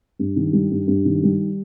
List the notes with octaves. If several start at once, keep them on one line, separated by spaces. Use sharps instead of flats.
G2
D#3
G3
G2
G2
D#3
G3